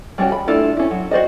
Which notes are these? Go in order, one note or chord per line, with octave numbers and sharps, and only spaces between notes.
G3 G#3 C4 C#4 F#4
B5
A3 D4 E4 F4 A4
C#4 E4
F#3
F#4 C5 D5 D#5